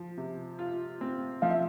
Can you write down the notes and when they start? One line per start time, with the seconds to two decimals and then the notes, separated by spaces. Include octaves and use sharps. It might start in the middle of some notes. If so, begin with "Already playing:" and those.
Already playing: F3
0.17 C3
0.59 F4
1.01 C4
1.42 F3 F5
1.50 E5